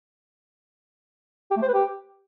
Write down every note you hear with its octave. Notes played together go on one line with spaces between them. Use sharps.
G4
A3
C5
B4
G4